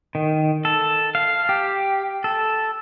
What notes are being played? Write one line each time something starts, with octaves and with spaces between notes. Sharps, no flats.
D#3
A4
F5
G4
A4